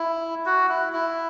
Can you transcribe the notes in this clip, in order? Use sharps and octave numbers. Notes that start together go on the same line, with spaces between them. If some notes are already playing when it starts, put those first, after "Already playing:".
Already playing: E4
F#4
E4
E4